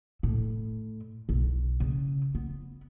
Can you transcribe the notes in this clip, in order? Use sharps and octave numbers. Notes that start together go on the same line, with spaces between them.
A2
B1
C#3
B3